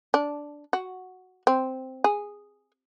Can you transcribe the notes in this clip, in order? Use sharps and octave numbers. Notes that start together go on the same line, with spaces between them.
D4
F#4
C4
G#4